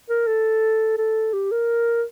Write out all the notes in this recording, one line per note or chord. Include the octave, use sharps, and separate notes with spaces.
A#4
A4
A4
G4
A#4